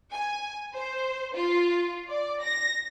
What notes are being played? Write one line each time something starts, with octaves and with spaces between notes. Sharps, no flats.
G#5
C5
F4
D5
A#6